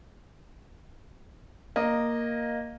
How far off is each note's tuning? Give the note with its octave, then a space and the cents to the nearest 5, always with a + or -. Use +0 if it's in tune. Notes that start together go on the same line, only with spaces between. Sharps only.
A#3 +0 D#5 -10